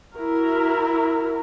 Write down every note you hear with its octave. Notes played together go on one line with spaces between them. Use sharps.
E4 F#4 A#4